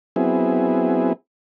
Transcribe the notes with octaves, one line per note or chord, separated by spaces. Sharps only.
F#3 B3 C4 E4 G#4